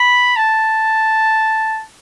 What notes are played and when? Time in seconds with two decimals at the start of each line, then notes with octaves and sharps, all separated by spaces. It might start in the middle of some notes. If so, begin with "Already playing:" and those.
Already playing: B5
0.36 A5